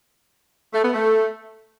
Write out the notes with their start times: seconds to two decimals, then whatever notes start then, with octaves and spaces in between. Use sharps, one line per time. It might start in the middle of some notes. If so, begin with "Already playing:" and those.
0.73 A3
0.84 B3
0.94 A3